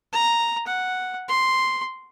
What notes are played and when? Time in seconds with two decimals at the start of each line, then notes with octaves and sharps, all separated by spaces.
0.13 A#5
0.67 F#5
1.28 C6